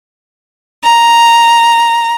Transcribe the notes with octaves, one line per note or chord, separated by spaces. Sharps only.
A#5